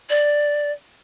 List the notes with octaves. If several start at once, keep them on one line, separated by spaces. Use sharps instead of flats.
D5